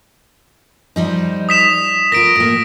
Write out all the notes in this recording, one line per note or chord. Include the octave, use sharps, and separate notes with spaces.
F3 G3 D#4
D#6 B6 E7
F4 A#4 A#6 D7
A2 A#3